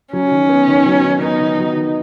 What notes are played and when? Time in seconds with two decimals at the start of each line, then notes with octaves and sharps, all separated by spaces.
0.13 F#3 C#4
0.31 D#3
0.49 B3
0.68 D#3
0.86 F#3
1.04 D#3
1.21 B3 D#4
1.40 D#3
1.58 F#3
1.76 D#3